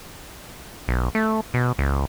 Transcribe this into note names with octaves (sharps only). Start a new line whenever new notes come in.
B1
A3
B2
C#2